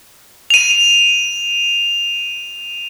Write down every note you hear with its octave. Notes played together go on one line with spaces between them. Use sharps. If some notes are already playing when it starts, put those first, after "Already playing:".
D#7 F7